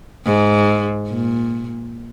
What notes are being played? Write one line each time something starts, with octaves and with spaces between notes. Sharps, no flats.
G#2
A#2